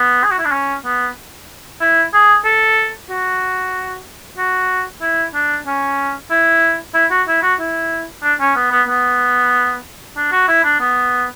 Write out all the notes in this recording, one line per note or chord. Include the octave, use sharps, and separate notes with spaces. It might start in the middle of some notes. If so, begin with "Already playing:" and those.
Already playing: B3
G#4
F#4
E4
D4
C#4
B3
E4
G#4
A4
F#4
F#4
E4
D4
C#4
E4
E4
F#4
E4
F#4
E4
D4
C#4
B3
B3
B3
D4
F#4
E4
D4
B3